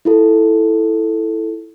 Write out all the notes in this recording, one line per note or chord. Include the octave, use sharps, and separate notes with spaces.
E4 F4 A4